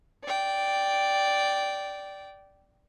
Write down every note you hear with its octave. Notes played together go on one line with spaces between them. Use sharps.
D5 G5